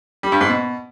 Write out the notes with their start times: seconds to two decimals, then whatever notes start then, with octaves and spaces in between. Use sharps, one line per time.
0.23 G3
0.32 G2
0.41 G#2
0.49 B2